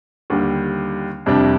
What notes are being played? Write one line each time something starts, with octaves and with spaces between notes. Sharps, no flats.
D#2 D3 G3
F2 C3 G3 D4